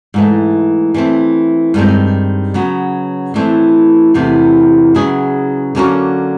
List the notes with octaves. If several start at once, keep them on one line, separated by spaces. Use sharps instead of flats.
G#2 E3 A3
E3 A3 C4
G2 D#3 G#3 C4
C#3 F#3 B3
A2 E3 A3 C4
E2 C3 E3 A3
C#3 F#3 B3 E4 G#4
D3 F#3 A#3 C#4 F#4